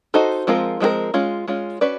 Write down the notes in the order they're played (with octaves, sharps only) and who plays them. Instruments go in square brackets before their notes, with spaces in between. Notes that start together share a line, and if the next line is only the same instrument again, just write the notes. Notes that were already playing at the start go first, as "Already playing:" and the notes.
[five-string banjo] D#4 F#4 A4 C5 D#5
F3 G#3 C4 F4 A#4
F3 G#3 C4 F4 A#4
G#3 C#4 F4
G#3 C#4 F4
C#4 F#4 B4 D5